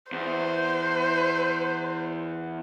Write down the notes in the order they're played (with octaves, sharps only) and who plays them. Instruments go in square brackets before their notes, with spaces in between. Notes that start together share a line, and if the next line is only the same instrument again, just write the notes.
[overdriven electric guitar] E2 [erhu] C5